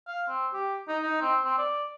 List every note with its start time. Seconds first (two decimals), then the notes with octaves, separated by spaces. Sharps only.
0.07 F5
0.28 C4
0.53 G4
0.88 D#4
1.03 D#4
1.21 C4
1.45 C4
1.58 D5